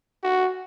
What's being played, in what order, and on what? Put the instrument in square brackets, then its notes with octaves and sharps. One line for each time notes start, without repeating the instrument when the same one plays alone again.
[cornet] F#4